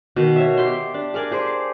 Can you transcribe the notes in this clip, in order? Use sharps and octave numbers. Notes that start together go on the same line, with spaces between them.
B2 D#3
C#5 E5
G4 C6
D4
G#4 A#4 D5 G#5
G4 G#4 C5 D5